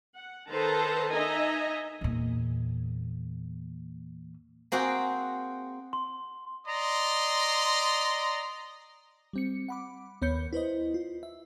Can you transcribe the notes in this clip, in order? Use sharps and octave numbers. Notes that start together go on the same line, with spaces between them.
F#5
D#3 A4 B4 C5 A5 A#5
D#4 D#5 E5 G#5 A#5
E2 A#2
A#3 C4 F#4 G#4 G5
C6
D5 D#5 A#5 C6
G3 C4 C#7
F#5 B5 D6
D#2 B3 C#5 B5 G6 C#7
E4 B4 C5 D#5
F4
E5